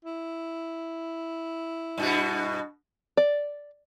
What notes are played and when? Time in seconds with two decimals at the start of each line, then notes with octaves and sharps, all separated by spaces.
0.05 E4
1.98 G2 B2 F#4
3.17 D5